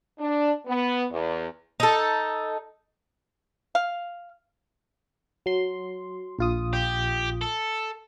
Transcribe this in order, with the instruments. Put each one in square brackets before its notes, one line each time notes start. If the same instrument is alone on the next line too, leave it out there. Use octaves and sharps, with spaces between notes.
[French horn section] D4
B3
E2
[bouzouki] D#4 A4
[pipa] F5
[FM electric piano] F#3 C6
A#1 F4 D#6
[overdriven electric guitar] G4
A4